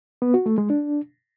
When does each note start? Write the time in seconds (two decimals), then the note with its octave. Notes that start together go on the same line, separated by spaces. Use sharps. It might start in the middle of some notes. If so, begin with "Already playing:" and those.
0.22 B3
0.34 F#4
0.46 A3
0.58 G#3
0.70 D4